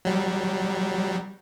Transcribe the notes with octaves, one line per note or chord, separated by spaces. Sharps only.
F#3 G3